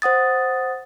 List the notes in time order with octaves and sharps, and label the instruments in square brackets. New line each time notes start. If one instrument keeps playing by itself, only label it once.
[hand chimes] C5 F#5 D#6 A6